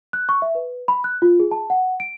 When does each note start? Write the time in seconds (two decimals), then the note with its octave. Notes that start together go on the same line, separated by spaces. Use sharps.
0.13 F#6
0.29 C#6
0.42 E5
0.55 B4
0.88 B5
1.04 F#6
1.22 F4
1.40 G#4
1.51 A5
1.70 F#5
2.00 D7